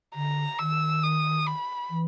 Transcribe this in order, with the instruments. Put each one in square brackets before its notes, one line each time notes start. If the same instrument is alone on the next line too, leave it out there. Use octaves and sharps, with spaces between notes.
[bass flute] D3 [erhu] A#5
[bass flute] D#3 [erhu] E6
[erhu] D#6
B5
[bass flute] E3